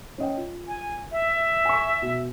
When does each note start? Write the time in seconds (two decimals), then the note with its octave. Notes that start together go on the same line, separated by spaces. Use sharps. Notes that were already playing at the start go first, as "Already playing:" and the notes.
0.18 C#4 D#5 G5
0.37 F4
0.68 G#5
1.12 E5
1.65 G#5 C#6
2.02 B2